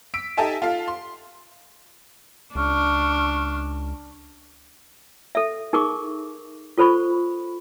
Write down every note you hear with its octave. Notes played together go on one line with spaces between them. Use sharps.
E6 B6 D7
D#4 G4 A4 E5 G#5 A5
F4 A4 F5
C6
C#2 D4 C#6 F6
A4 E5
D#4 G#4 A#4 C#6 D6
F4 A4 C5 B5 C#6